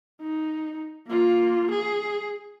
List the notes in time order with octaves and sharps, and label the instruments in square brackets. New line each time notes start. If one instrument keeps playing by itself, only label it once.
[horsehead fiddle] D#4
A#3 F4
G#4